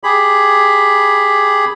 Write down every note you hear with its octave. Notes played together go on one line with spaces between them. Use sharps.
G4 G#4 B5